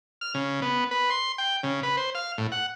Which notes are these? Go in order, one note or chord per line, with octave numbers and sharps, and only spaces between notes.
F6
C#3
B3
B4
C6
G5
C#3
B4
C5
F5
A2
F#5